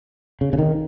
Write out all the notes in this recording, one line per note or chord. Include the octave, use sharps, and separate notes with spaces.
C#3
C#3
D#3